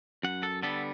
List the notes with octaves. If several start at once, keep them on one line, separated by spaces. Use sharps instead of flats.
F#2 F#5
A4
D3 G3 B3 A4